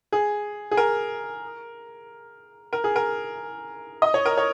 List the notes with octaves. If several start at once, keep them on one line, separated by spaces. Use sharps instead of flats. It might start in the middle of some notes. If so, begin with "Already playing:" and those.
G#4
G#4
A#4
A#4
G#4
A#4
D#5
C#5
A#4
C#5